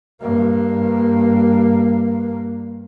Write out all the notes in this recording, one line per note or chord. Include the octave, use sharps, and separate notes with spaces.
G2 A#3